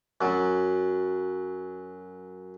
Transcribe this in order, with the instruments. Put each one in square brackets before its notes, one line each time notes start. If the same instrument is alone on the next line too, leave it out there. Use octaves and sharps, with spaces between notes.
[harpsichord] F#2 F#3